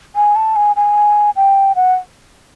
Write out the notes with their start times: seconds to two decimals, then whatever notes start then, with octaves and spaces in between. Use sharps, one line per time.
0.16 G#5
0.36 A5
0.56 G#5
0.76 G#5
1.36 G5
1.76 F#5